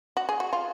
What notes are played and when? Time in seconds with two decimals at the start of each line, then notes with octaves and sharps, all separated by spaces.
0.17 F#4
0.29 G#4
0.40 F#4
0.53 F4